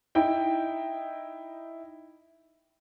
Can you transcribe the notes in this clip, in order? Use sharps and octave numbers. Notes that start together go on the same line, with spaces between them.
D#4 E4 G5